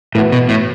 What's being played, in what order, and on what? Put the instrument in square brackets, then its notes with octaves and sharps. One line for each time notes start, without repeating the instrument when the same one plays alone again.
[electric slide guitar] A2 [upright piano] E3 B3 F#4
[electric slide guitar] B2
A2